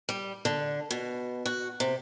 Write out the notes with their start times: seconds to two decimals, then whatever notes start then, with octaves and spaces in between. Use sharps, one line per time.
0.09 G3
0.45 D3
0.91 B2
1.46 F#4
1.80 C3